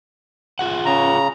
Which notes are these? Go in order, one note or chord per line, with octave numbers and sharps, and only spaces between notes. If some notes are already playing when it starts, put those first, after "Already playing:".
F4 G#4 F#5
C#3 A#5